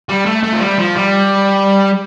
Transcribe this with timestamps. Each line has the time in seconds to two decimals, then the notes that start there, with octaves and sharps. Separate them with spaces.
0.09 G3
0.26 A3
0.43 A3
0.53 F3
0.61 G3
0.78 F3
0.96 G3